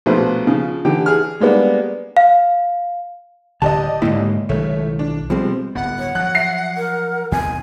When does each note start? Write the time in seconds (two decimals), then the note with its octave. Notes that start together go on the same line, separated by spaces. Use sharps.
0.06 A#1 B2 A3 B4 C5
0.47 C#3 F3
0.85 D3 E3 G4 G5
1.06 G#4 F6
1.40 G3 G#3 A#3 B3 D4
2.17 F5
3.62 D1 D3 G4 D5 D#5 A5
4.02 C#2 G#2 D3 A#3 E4
4.49 B1 D#3 A3 C#5
4.99 D4
5.30 B2 F3 G3 G#3 C4
5.75 D1 G1 B3 F#5
5.99 C#5
6.15 F3 F#3 F#6
6.35 E5 C7
6.77 A#4
7.32 D#2 B2 C4 G#5